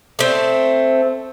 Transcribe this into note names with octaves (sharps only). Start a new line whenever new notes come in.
A3 C4